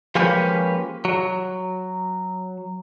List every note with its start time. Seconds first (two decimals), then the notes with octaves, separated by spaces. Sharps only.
0.15 F3 G#3 A#3 C#4 G4 B4
1.05 F#3